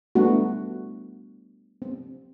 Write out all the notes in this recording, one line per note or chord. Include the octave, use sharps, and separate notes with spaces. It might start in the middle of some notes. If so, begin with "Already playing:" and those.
G3 A3 B3 D4 F#4
C4